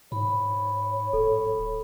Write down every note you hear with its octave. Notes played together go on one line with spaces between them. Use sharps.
G#2 C#5 B5
D1 A4